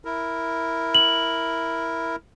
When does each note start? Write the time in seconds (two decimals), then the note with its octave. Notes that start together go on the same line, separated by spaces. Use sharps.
0.05 E4 A#4
0.95 F#7